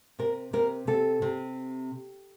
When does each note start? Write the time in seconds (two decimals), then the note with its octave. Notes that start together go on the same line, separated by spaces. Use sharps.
0.19 C3 A#4
0.53 C3 A#4
0.87 C3 A4
1.22 C3